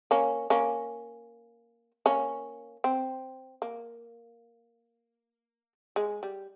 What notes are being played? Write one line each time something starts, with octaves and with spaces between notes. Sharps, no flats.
A#3 C#4
A#3 C#4
A#3 C#4
C4
A#3
G#3
G3